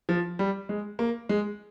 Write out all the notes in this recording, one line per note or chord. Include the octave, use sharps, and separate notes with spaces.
F3
G3
G#3
A#3
G#3